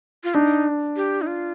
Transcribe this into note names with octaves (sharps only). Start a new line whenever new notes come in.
F4
D4 D#4
G4
D#4
F4